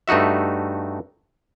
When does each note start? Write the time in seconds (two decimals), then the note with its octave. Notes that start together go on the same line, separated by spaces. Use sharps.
0.08 G2 A3 D#4 F#4 E5